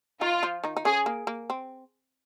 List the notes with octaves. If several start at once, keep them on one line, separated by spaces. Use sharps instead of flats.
D#3 D#4 F4
F3 F4
D#3 D#4
D#4
C#3 C#4 G#4
A#3
A#3
C4